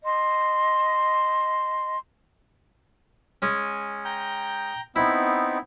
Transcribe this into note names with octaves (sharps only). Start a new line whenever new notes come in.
D#5 C6
G#3 C#4
G5 A#5 G6
B3 C4 D#4 E4